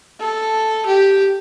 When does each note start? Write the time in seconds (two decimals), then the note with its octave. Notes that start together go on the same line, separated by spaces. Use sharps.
0.20 A4
0.86 G4